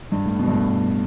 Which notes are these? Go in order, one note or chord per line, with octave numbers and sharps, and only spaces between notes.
G2
A2
B2
G2
A2